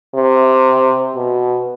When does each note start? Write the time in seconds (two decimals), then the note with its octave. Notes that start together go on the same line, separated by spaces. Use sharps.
0.15 C3
1.15 B2